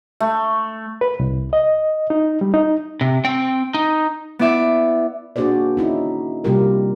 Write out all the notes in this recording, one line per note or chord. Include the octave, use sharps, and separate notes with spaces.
A3
B4
C2
D#5
D#4
G3
D#4
C3
C4 G5
D#4
B3 E4 D5 E5 D6
A#3 D4 F#4 G#4 C5 D5
C#4 D#4 E4
C3 G3 A#3 F4 G4 A#4